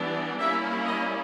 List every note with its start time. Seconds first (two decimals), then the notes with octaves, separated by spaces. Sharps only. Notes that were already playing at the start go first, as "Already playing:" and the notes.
Already playing: E3 G3 B3 D4
0.38 G3 A#3 C#4 E4 E5
0.85 D#5